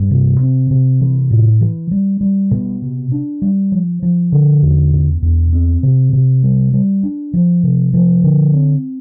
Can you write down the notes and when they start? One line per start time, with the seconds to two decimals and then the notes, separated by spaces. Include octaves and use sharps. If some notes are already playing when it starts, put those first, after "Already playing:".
Already playing: G2
0.11 C3
0.41 C4
0.71 C3
1.01 E3
1.30 A2
1.61 E3
1.91 G3
2.21 G3
2.51 B2
2.82 C3
3.12 D4
3.42 G3
3.72 F3
4.02 F3
4.32 D3
4.62 E2
4.92 B2
5.22 E2
5.52 C4
5.83 C3
6.13 C3
6.43 G3
6.73 G3
7.03 D4
7.34 F3
7.63 C3
7.94 F3
8.24 D3
8.54 C4